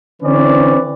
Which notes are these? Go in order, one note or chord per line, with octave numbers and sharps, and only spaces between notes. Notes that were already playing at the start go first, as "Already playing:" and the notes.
D3 E3 C4 C#4 B4 D5